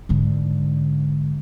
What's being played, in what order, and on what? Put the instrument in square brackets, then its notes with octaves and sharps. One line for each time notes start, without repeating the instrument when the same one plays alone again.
[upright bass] G#2 D3